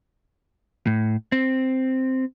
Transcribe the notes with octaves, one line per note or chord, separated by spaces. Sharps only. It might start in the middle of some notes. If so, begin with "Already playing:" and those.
A2
C4